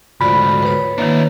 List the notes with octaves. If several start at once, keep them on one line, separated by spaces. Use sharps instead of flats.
D2 G#2 F4 F#4 D5 B5
B4 C#5
D#3 A#3 D4 E4